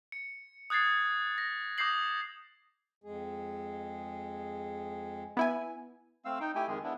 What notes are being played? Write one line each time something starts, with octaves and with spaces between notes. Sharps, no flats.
C#7
D#6 F#6 G#6 A6 C7
A#6
D6 D#6 G6 A#6 C7 F#7
F2 G#3 G#4
B3 E4 G#5
A3 C4 F5 E6
D#4 G5
A3 E4 G4 G5 G#5
F2 D#3 G#3 G#4
B3 D4 E4